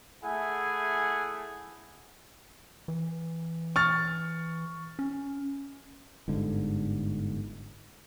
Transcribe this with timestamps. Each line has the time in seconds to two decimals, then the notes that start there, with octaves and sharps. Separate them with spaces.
0.24 A3 E4 G#4 F#5 G#5
2.88 E3
3.76 C#6 F6 A6
4.99 C#4
6.28 G1 G#2 D3